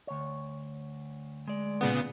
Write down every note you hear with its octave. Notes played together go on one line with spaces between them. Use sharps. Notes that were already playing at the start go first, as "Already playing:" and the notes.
D2 C#5
G#3 D5
A#2 C#3 B3